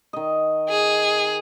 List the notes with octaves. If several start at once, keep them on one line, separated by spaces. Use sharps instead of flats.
D#3 D#5
G#4